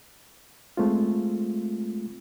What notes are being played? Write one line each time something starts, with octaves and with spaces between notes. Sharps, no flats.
G#3 A3 C4 F4